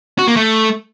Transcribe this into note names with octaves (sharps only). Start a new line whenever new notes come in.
F#4
A#3
A3